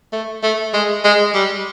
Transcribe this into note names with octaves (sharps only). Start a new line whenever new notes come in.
A3
A3
G#3
G#3
G3